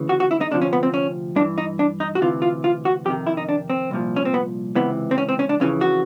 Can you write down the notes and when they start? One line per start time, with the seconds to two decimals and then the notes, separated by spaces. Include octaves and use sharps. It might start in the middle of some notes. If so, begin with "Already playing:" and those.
Already playing: D2 C#3 E3
0.09 F#4
0.20 F#4
0.31 E4
0.41 D#4
0.51 D2 C3 F3 D4
0.62 C#4
0.73 B3
0.83 C4
0.94 C#4
1.36 G2 D4
1.40 E3
1.58 D#4
1.79 D4
2.00 D#4
2.15 F#4
2.21 D2 C3 E3 F4
2.42 F4
2.64 F4
2.85 F#4
3.05 F2 C3 D#3 G4
3.27 E4
3.37 D#4
3.49 D4
3.70 C4
3.91 C2 A#2 F3
4.16 C#4
4.25 C4
4.34 B3
4.75 C#2 C3 E3 B3
5.11 C4
5.18 C#4
5.29 C4
5.39 C#4
5.49 D4
5.60 F2 C#3 E3 C#4
5.81 F#4